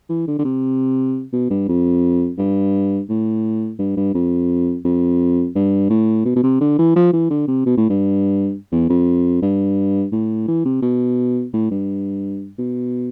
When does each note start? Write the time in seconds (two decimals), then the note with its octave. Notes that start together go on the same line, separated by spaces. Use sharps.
0.09 E3
0.27 D3
0.39 D3
0.45 C3
1.33 B2
1.50 G2
1.68 F2
2.38 G2
3.09 A2
3.79 G2
3.97 G2
4.14 F2
4.85 F2
5.55 G2
5.90 A2
6.25 B2
6.36 B2
6.43 C3
6.61 D3
6.79 E3
6.96 F3
7.13 E3
7.31 D3
7.48 C3
7.66 B2
7.77 A2
7.90 G2
8.72 E2
8.90 F2
9.42 G2
10.12 A2
10.48 E3
10.65 C3
10.82 B2
11.53 A2
11.71 G2
12.59 B2